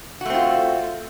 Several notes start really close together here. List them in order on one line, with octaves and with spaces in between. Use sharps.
F#4 A3 C4 F4